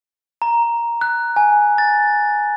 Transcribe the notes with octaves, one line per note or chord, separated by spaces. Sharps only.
A#5
F#6
G#5
A6